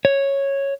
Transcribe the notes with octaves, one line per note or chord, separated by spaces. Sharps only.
C#5